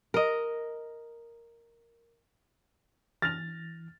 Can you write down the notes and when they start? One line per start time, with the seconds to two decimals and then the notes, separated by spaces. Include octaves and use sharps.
0.14 A#4 D#5
3.22 E3 F6 A6 A#6 F7